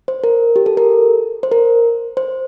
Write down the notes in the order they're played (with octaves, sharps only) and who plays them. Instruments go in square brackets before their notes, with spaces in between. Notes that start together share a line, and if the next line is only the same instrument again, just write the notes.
[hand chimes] C5
A#4
G4
A4
A#4
C5
A#4
C5